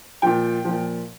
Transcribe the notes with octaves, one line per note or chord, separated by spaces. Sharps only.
A#2 F3 G5
A#2 F3